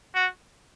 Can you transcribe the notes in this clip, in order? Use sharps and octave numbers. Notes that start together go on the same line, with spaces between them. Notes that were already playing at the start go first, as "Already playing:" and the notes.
F#4